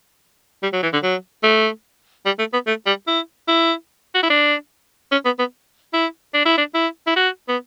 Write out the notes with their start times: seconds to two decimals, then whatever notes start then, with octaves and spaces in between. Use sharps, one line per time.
0.63 G3
0.73 F#3
0.83 E3
0.93 D3
1.03 F#3
1.43 A3
2.26 G3
2.39 A3
2.53 B3
2.67 A3
2.86 G3
3.07 E4
3.48 E4
4.15 F#4
4.23 E4
4.30 D4
5.12 C#4
5.25 B3
5.39 B3
5.94 E4
6.34 D4
6.45 E4
6.58 D4
6.75 E4
7.07 E4
7.16 F#4
7.49 B3